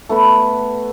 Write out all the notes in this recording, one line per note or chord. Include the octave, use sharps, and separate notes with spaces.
A3 B3 B4